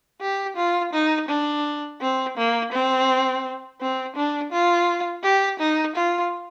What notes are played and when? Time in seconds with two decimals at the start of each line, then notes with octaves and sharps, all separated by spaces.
0.21 G4
0.57 F4
0.93 D#4
1.29 D4
2.01 C4
2.37 A#3
2.72 C4
3.81 C4
4.16 D4
4.52 F4
5.23 G4
5.60 D#4
5.96 F4